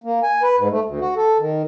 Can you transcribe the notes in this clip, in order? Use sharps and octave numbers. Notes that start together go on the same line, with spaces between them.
A#3
G#5
B4
G#2
A3
D2
F#4
A4
D#3